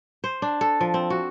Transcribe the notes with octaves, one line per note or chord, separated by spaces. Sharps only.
C5
D4
A4
F3
C4
F#4